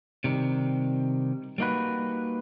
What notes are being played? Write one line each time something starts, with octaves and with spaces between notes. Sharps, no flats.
C3 D#3 G3
G3 A#3 D#4 F#4 B4